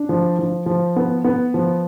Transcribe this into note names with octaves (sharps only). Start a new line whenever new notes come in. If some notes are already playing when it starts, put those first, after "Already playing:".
Already playing: D4
F3
F3
F3
B3
B3
F3